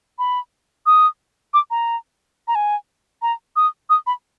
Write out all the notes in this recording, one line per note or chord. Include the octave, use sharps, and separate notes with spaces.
B5
D#6
D6
A#5
A#5
G#5
A#5
D#6
D#6
B5